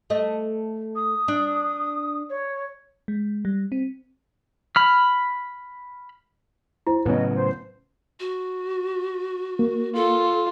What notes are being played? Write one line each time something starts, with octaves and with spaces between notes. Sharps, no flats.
A3 D#5
D#6
D4
C#5
G#3
G3
C4
B5 F6
E4 C5
A2 C#3 F#3 B3 C#4 D#5
C5
F#4
A#3
F4 A4